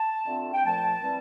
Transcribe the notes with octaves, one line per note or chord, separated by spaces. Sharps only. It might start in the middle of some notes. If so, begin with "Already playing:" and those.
Already playing: A5
D3 A3 C4 F4
G5
A#2 F3 A3 A5
E3 G3 C4